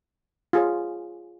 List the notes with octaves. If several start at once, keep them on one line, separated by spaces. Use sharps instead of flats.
F4 G#4 C#5